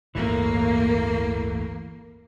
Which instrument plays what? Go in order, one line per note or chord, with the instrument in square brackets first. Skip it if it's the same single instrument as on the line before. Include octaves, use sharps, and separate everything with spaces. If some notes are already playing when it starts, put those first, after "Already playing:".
[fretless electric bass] D1 G1 [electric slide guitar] E3 A3 [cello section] A#3